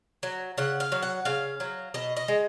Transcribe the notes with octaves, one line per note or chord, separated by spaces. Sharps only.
F#3
C#3 F#5
F5
F#3
F#5
C#3 F5
F#3
B2 D#5
D#5
G#3